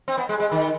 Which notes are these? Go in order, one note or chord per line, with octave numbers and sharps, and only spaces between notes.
C4
B3
G#3
G#3
D#3